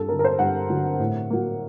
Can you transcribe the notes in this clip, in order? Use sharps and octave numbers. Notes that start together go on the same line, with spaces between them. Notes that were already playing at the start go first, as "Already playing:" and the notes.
Already playing: G2 A4
D3 F#3 A#4
A#4
C5
G2 F#5
D3 F#3
A2
F#3 A#3